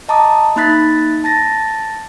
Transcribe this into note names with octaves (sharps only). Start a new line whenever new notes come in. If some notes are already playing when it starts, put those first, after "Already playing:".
D#5 A5 A#5 D6 D#6
A#3 D#4 B5 F#6 A6 B6
A5 A6 A#6